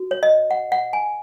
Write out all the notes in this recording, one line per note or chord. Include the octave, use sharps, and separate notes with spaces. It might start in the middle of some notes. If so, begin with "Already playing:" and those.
Already playing: F#4
C#5
D#5
F#5
F#5
G#5